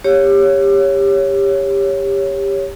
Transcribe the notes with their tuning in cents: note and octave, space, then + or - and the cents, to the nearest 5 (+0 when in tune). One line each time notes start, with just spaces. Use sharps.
G4 +20 C#5 -5